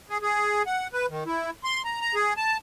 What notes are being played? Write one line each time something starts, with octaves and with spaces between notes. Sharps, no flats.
G#4
G#4
F#5
B4
D#3
E4
C6
A#5
A#5
G#4
A5